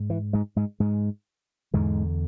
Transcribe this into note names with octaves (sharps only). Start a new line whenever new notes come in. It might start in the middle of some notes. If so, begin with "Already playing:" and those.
Already playing: G#2
E3
G#2 G#3
G#2 G#3
G#2 G#3
E2 G#2 D3 G#3